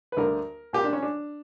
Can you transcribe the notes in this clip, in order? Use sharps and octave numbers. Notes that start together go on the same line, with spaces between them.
B4
D2 D3 G3 A#3 A#4
A#2 A#3 G4
D4
C#4
D4